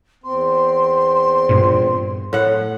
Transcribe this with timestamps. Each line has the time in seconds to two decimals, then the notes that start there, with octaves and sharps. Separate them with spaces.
0.24 E2 C4 C6
1.49 G2 A#2
2.33 A2 F#5